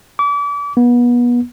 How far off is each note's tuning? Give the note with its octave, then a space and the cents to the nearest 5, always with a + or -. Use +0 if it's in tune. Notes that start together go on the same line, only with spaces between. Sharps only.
D6 -35
B3 -30